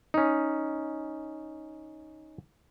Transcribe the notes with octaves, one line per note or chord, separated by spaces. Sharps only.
C#4 D#4